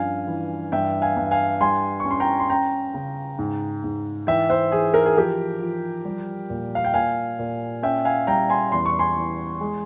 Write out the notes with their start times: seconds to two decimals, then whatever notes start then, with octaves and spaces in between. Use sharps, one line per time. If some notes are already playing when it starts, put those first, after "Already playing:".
Already playing: G2 F3 C#4 F5 G#5
0.27 E3
0.72 G2 E5 G5
1.02 F5 G#5
1.17 G2
1.31 F5 G#5
1.61 G3 G#5 C6
2.00 C#6
2.05 C#4
2.11 C6
2.20 G5 A#5
2.40 C6
2.50 C#4 G5 A#5
2.94 C#3
3.39 G#2
3.84 G#2
4.27 E3 E5 G5
4.49 C5 E5
4.72 E3 G#4
4.94 A#4
5.06 G#4
5.16 F3 G4 A#4
5.61 F3
6.05 G3
6.50 A#2
6.75 F5
6.85 G5
6.94 A#2 F5 G#5
7.39 A#2
7.83 C#4 E5 G5
8.05 F5 G#5
8.27 G3 G5 A#5
8.50 G#5 C6
8.72 E2 C6
8.86 C#6
8.99 G#5 C6
9.17 E3
9.61 G#3